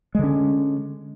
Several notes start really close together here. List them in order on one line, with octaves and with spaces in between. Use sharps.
G#3 D3 C#4